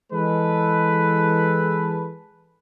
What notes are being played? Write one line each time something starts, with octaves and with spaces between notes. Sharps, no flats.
E3 G#3 A4 B4